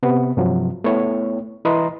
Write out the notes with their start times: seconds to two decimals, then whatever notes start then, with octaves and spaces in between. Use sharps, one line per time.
0.03 C3 B3
0.37 G2 C3 F3 F#3
0.84 A3 B3 E4 C#5
1.65 E3 E4 B4 D#5 A#5 C6